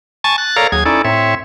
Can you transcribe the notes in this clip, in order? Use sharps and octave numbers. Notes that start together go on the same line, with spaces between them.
G#5 A5 C#6 A6
F#6 A6
A4 A#4 C#5 D5 F5 A#5
D#2 F#3 G#4 G#6
C#4 D#4 E4 A4 D5
A2 C4 C#5 E5